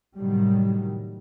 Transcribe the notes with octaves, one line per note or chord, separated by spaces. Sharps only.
A2 C3 D#3 F#3 G3